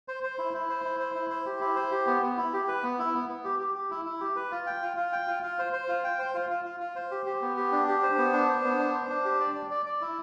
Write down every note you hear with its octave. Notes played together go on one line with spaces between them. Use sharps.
C5
C5
E4
E4
C5
E4
C5
E4
C5
G4
E4
C5
G4
B3
B3
E4
G4
B4
B3
E4
B3
B3
G4
G4
G4
E4
E4
G4
B4
F4
G5
F4
F4
G5
F4
F4
C5
C5
F4
G5
C5
F4
F4
F4
F4
C5
G4
G4
B3
G4
D4
G4
C5
B3
D4
C5
B3
D4
C5
D4
G4
D5
D5
D5
D5
E4